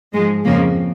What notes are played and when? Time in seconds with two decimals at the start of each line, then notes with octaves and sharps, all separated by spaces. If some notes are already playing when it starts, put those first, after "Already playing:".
0.13 G#2 F3 G#3
0.44 F2 C#3 F3 A#3